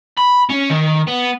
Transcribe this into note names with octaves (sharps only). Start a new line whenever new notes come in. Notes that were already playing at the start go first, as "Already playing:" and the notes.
B5
C#4
D#3
B3